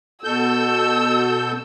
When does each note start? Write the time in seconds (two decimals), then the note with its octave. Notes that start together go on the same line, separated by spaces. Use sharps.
0.24 B2 A4 E6 G6